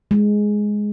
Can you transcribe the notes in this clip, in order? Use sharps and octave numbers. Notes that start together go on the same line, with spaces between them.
G#3